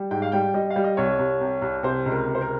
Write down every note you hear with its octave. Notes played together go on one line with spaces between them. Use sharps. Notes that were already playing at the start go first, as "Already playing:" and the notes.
Already playing: G3
G#2 G5
F5
G3 G5
G3 D#5
F5
G3
D#5
C2 C#5
C2
C3
C2
C3 C5
C#2
A#4
C3
C5
A#4